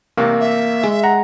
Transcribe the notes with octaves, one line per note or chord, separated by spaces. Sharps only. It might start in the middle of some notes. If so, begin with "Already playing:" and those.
A1 C3 A#3
E5
G#3
F#5 A#5